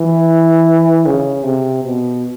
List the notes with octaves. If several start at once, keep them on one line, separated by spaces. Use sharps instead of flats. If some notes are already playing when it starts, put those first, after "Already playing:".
Already playing: E3
C#3
C3
B2